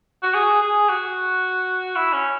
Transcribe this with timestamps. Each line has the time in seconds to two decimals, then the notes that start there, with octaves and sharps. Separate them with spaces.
0.23 F#4
0.34 G#4
0.62 G#4
0.89 F#4
1.96 E4
2.13 C#4